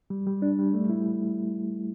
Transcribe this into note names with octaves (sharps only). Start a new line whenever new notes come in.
G3
G3
D4
G3
A3
E4